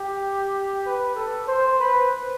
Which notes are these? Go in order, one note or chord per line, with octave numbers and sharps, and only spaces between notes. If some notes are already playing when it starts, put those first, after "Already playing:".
Already playing: G4
B4
A4
C5
B4